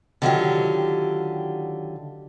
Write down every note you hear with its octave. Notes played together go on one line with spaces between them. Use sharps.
D3 D#3 F#3 B3 F4 G4